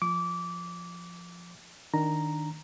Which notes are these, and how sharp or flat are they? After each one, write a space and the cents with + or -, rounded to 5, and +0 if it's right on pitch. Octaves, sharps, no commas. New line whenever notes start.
F3 +0 D6 -20
D#3 +0 D4 +0 A#5 +0